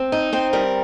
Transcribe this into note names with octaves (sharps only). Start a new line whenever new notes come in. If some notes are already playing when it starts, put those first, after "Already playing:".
Already playing: C4
D#4
C4 C5
G3 A#4